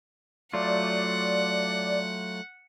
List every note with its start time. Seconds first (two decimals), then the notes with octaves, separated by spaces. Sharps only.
0.53 F#3 A3 F4 D5 F#5